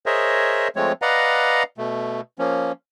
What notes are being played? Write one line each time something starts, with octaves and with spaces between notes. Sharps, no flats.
G#4 A#4 C5 C#5 D#5 E5
F3 G#3 A3 C4 C#5
B4 D5 D#5 F5 F#5 A#5
B2 A3
F3 A#3 C#4